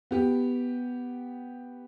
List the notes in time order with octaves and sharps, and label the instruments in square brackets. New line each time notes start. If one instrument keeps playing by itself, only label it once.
[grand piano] B3 G4